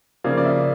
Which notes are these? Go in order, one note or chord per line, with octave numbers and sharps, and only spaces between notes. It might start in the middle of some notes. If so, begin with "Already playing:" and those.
C#3 F3 A#3 D5
D5
E5